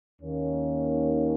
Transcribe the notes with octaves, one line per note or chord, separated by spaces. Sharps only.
D#2 D#3 A#3 C#4